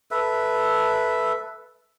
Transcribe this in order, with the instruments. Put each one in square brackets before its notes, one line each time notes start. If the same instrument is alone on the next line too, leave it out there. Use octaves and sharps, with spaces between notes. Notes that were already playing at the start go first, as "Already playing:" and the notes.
[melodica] A4 B4 E5